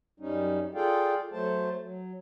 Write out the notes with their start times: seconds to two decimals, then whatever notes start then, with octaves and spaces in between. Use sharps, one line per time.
0.20 F#2 G3 C#4 D#4
0.75 F4 G#4 A4 D5 F5 G5
1.32 F#3 A3 C5 A5
1.82 F#3